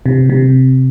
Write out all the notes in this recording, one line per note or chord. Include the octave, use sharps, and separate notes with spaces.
C3
C3